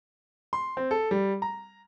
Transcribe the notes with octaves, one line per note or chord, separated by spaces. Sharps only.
C6
C4
A4
G3
A#5